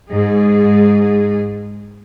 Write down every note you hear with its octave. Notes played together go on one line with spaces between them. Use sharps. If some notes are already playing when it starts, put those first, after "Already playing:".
G#2 G#4